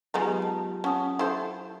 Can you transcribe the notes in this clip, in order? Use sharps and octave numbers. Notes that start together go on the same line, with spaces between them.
F#3 G#3 B3 D#4 F4 G4
A5
C#4 F#5 A5 D#6
E4 A4 C5